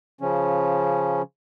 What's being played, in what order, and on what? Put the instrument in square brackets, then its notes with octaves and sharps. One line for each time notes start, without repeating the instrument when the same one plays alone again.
[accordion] C#3 F3 C#4